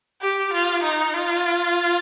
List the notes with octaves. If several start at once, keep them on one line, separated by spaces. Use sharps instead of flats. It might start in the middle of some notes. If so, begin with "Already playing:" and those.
G4
F4
D#4
F4